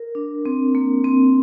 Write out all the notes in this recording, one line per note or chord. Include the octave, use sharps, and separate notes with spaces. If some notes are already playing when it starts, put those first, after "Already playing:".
Already playing: A#4
D4
C4
A#3
C4